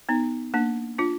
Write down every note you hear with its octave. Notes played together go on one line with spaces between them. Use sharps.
B3 D#4
A#3 D4
D4 F4